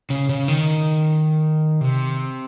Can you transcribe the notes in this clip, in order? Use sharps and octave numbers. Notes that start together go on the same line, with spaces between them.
C#3
C#3
D#3
C3